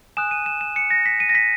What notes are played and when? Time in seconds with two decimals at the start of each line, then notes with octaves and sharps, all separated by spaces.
0.17 G#5 D#6 F#6 E7
0.31 D#7
0.46 E7
0.61 E7
0.76 C#7
0.90 A#6
1.05 B6
1.20 D#7
1.29 A#6
1.35 B6